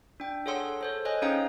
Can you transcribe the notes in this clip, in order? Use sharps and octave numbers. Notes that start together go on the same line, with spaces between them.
D4 G5
G#4 A4 C#5 F#5 C6 E6
A4 C5 C#5
C5 C#5 D#5 G#5 F#6
C#4 D#4 G#4 F5 G5 A#5